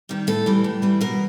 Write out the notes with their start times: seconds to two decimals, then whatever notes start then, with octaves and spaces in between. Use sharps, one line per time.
0.09 D#3 G3
0.27 A2 A4
0.46 E3 G3
0.64 A2
0.82 E3 G3
1.01 B2 A#4